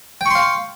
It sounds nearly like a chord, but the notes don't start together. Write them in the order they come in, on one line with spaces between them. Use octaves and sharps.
G5 C#6 C6 F5